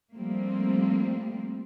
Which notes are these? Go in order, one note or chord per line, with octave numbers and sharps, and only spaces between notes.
F3 G3 A3 A#3 C4